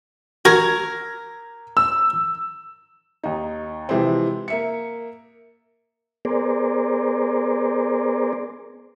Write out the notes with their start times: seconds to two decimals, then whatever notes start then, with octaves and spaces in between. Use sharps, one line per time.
0.45 F#4 A#4 G#6 A#6
1.77 E6
3.23 D#2 D#4
3.89 C3 E3 F3 G#3 C4
4.48 A#3 E5 C#7
6.25 B3 G#4 A#4 C5 D5